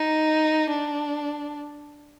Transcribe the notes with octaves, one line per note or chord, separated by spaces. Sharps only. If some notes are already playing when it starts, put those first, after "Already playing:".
Already playing: D#4
D4